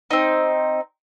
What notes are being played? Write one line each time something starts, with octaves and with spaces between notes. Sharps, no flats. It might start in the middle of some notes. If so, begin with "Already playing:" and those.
C4 D#4